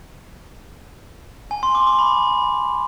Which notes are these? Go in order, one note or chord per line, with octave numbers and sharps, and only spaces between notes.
G#5
C6
D6
D6
B5